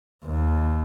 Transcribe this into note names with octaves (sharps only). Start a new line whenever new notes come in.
D#2